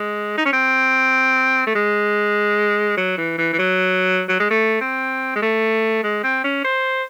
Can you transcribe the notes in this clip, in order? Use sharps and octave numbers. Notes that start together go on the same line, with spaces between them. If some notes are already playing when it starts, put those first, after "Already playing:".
Already playing: G#3
D#4
C#4
C4
A3
G#3
F#3
E3
E3
E3
F#3
F#3
G#3
A3
C4
G#3
A3
G#3
C4
C#4
C5